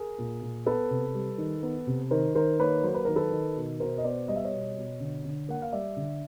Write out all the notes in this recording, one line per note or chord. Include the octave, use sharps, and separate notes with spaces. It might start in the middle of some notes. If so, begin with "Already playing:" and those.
Already playing: G#4 A#4
A#2
A#2
B3 A4 B4
C3
G3
D#3
B3
C3
D#3 A#4 C5
D#3 A#4 C5
A#3 B4 C#5
F#3 C5
B4
D#3 A#4
A4 B4
D#3
B2
B2 A#4 C5
D#5
B3 C5 D5
G3 D#5
E5
C#5 D#5
B2
B2
D3
D3
A#3 F#5
F5
G3 D5 E5
D3